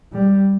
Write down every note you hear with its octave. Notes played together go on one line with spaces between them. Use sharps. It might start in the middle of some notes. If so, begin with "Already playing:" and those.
G3